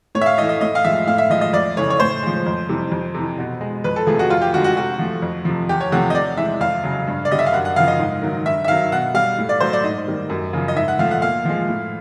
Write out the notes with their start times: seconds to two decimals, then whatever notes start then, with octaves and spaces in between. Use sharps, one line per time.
0.15 A2 C#5
0.21 E5
0.26 F5
0.38 E3 A3 D#5
0.49 D#5
0.61 A2 D#5
0.75 F5
0.84 F3 G#3 E5
1.07 A2 F5
1.18 E5
1.30 F3 G#3 D#5
1.41 D#5
1.53 F2 D5
1.77 C#3 E3 A3 C#5
1.90 C#5
2.00 A2 C5
2.22 F3 G#3
2.46 F2
2.69 C3 E3 G3
2.92 F2
3.14 C3 E3
3.38 B2
3.61 G#3
3.84 F2 B4
3.96 A4
4.07 C3 F3 A3 G#4
4.19 F#4
4.30 F2 F4
4.42 G4
4.53 D3 F3 G#3 F#4
4.64 F#4
4.76 C3 F#4
4.99 F3 A3
5.22 F2
5.45 C3 F3
5.69 E2 G4
5.81 C#5
5.92 C3 F3 A3 F#5
6.10 D#5
6.14 C3 D5
6.37 E3 G#3 E5
6.61 F2 F5
6.83 C#3 F#3
7.07 G2
7.25 D5
7.31 D3 G3 D#5
7.39 E5
7.46 F5
7.53 F#2 F#5
7.65 F#5
7.76 C#3 F3 F5
7.88 D#5
7.99 G#2
8.22 D#3 F#3
8.45 G2 E5
8.64 E5
8.68 D#3 F#3 F5
8.92 B2 F#5
9.14 G3 F5
9.38 A2
9.49 D5
9.60 F#3 A3 C5
9.73 D5
9.84 G#2 D#5
10.08 D#3 G3
10.29 F#2
10.53 C#3 F3
10.68 D#5
10.76 G#2 E5
10.88 F#5
10.99 F3 A3 F5
11.11 F#5
11.22 A#2 F5
11.45 F3 G#3
11.68 A2